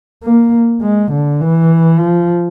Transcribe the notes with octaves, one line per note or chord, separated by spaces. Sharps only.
A#3
G#3
D3
E3
F3